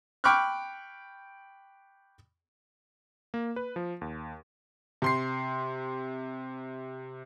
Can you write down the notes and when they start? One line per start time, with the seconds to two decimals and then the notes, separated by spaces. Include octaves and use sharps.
0.24 G5 B5 C#6 D6 F6 F#6
3.34 A#3
3.56 B4
3.76 F3
4.01 D#2
5.02 C3 C6 C7